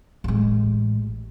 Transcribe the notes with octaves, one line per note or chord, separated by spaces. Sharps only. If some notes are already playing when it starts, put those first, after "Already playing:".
A1 G#3